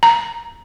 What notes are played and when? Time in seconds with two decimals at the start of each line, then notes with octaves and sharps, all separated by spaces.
0.03 A#5